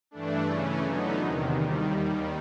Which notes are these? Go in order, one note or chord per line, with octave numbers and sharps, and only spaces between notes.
G2 E3 A3 D4
C#3 E3 A3 C#4
D3 F#3 B3 D#4
E2 C3 D#3
D#2 D#3 G3